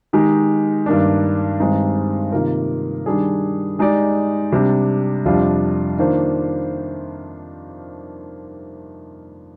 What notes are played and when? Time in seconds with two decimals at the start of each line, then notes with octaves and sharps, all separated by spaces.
0.13 D#3 G#3 D#4 G4
0.86 G2 D#3 A#3 D4
1.60 G2 D#3 G#3 C4 D#4
2.32 C3 D#3 A#3 F4 A#4
3.06 D#3 G3 D4 G#4
3.79 G#3 D#4 G4 D5
4.52 C3 G3 D4
5.26 F2 C3 G3 D4 F4
5.98 D#3 A#3 D4 F4 C5